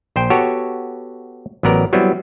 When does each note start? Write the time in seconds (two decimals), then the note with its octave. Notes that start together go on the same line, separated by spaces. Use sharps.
0.16 A#1 C5 G5
0.30 B3 F#4 G4 A4 C#5
1.63 A1 F#3 B3 A#4 D5
1.93 F#3 G3 B3 C4 E4